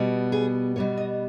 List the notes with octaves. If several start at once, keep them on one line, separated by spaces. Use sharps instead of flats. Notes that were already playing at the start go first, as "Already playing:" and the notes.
Already playing: B2 G3 B3
G#4
B2 G3 B3 C#5
D#5